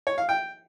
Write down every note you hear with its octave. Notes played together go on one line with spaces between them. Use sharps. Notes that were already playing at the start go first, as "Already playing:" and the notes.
C#5
F5
G5